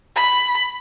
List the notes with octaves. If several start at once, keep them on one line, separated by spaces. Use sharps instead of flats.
B5